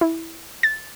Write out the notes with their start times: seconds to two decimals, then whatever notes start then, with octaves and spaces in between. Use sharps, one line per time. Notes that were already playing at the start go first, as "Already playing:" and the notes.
0.01 E4
0.63 A6